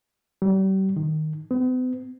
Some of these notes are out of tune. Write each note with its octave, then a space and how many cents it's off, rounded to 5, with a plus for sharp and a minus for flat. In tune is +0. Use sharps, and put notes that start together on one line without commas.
G3 -40
D#3 -5
B3 +45